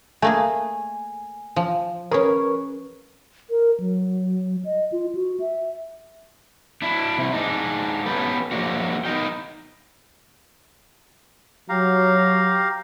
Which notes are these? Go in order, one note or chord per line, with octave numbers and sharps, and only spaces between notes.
A3 A#3 G#4 G#5
F3
C#4 G#4 A#4 B4 C#6
A#4
F#3
D#5
F4
F#4
E5
D4 E4
C3 E4
G#3 D4 D#4
B3 C#4 G4 A4 B4
F3 F#3 G#3 A#3 D4 F#4
B3 D#4 A#4 D#5 G5
F#3 G4 F5 A#5